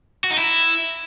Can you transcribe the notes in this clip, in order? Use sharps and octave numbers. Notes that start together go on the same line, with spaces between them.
F#4
D#4
E4